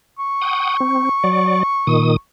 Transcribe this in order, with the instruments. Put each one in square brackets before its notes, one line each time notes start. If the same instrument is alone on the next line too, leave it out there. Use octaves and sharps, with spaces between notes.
[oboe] C#6
[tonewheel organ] F#5 G5 D#6
C4
F#3 D5
A#2 D#3 D#6